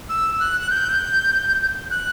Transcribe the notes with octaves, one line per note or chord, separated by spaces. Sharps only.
E6
F#6
F#6
G6
F#6